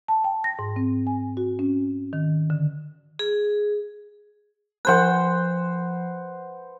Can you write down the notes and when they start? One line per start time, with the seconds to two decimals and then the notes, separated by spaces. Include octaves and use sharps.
0.08 A5
0.24 G5
0.44 A#6
0.59 G#2
0.76 C4
1.07 G#5
1.37 F#4
1.59 C#4
2.13 D#3
2.50 D3
3.19 G#4
4.85 F3 B4 C5 F#5 F#6